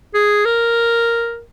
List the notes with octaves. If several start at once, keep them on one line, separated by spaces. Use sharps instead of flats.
G#4
A#4